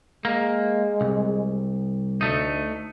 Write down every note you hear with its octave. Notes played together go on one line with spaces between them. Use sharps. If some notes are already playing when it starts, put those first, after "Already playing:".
G#3 A#3
C2
D2 A3 D#4